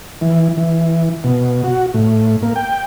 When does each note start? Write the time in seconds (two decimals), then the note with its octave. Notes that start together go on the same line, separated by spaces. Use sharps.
0.21 E3
0.57 E3
1.24 B2
1.64 F#4
1.94 A2
2.42 A#3
2.56 G5